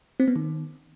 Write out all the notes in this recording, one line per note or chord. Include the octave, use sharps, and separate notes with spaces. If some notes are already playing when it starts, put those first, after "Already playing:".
C4
B3
D#3